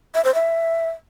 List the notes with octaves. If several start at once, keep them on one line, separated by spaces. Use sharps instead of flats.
E5
C5
E5